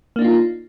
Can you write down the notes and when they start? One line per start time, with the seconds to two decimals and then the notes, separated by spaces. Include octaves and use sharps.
0.16 A#3
0.19 D4
0.22 D#4
0.24 F4